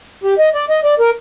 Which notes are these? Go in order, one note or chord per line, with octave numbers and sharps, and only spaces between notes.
G4
D#5
D5
D#5
D5
A#4